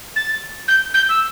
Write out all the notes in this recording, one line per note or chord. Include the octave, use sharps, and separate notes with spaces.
A6
G6
G6
E6